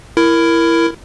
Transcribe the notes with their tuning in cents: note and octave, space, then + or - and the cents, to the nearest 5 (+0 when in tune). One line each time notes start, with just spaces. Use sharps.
E4 +15 A#4 +0